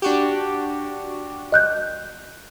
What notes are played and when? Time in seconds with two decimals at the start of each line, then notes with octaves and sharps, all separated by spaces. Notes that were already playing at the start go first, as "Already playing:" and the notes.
0.02 D4 F#4 G4
1.52 D#5 F#6 G6